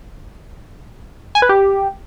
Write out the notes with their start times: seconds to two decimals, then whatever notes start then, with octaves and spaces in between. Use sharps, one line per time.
1.35 G#5
1.42 B4
1.49 G4